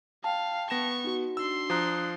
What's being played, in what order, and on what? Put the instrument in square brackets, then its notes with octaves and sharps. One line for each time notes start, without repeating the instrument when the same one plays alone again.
[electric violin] F5 [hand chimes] G5 A5
[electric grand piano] B3 A#6 E7 [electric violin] C#6
[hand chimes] D#4 F#4
[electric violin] D4 C6 [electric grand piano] E6
[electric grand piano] F3 A#5 [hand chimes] D#6 F#6